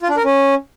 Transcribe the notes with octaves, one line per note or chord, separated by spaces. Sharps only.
F4
D4
A#4
C#4